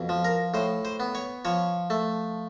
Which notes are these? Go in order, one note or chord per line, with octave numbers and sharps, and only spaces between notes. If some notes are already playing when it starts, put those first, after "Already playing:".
Already playing: F2 B2
F3
A#4
A2 C5
C5
B3
C#5
F3 C#5
A3